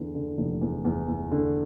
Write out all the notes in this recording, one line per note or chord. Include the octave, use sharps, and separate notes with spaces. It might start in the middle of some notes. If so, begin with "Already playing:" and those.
Already playing: E2 D3
D3
F1
E2
E2
E2
D3